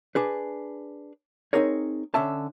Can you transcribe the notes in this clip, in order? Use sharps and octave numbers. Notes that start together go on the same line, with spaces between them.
D4 G#4 B4
C4 D#4 G#4 A#4 C#5
D3 C#4 E5 A5